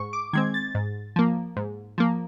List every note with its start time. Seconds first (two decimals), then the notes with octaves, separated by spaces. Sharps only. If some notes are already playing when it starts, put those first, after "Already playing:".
Already playing: G#2 C#6
0.13 D6
0.33 D#3 G#3 C4 G#6
0.54 A6
0.75 G#2
1.16 F3 A#3
1.57 G#2
1.98 F3 A#3